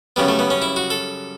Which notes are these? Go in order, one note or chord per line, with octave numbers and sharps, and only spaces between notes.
F#2 C#3 G3 B3
A3
B3
C#4
E4
F#4
A4